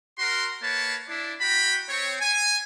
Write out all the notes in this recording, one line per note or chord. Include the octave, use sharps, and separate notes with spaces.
F#4 A#4 C6
A#3 B4 C#5 A5
D4 E4
F#4 G5 A#5 B5
C4 C#5
G#5